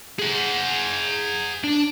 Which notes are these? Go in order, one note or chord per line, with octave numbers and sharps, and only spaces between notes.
G#4 F#5
D4